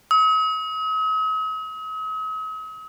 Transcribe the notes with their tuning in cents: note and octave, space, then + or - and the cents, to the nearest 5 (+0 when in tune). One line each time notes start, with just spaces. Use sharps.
D#6 +45